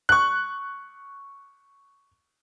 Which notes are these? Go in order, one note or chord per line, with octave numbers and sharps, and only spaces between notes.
C#6 F#6